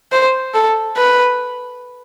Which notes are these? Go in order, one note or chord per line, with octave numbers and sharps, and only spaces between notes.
C5
A4
B4